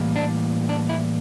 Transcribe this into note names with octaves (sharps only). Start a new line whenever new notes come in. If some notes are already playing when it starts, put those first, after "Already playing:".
Already playing: A2 E3 G3 A#3
D4
D4
E4